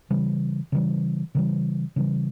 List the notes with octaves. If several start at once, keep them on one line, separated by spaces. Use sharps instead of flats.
C#3 E3 G3
C#3 E3 G3
C#3 E3 G3
C#3 E3 G3